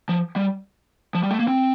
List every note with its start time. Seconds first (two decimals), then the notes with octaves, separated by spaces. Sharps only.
0.09 F3
0.36 G3
1.15 F3
1.23 G3
1.31 A3
1.39 A#3
1.48 C4